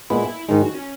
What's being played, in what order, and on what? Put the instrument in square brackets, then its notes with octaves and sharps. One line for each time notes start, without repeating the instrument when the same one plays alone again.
[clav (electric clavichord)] A#2 G#3 B3 [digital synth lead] E4
[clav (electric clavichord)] G#2 D#3 G#3 [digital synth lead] D#4
[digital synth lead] F#4
C#4